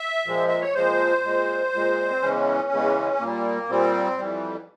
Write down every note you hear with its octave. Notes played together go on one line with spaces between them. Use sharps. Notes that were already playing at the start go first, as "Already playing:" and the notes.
Already playing: E5
A#2 F3 G#3
E5
C#5
A#2 F3 G#3 C5
A#2 G#3
A#2 G#3
C4
E2 C#3 E3 G#3 C#4
E2 C#3 E3 G#3
A#2 G3 A#3
A#2 G3 C4
F2 E3 G3